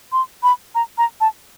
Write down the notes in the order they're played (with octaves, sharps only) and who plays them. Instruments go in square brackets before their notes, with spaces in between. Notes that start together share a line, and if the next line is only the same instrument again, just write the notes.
[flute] C6
B5
A#5
A#5
A5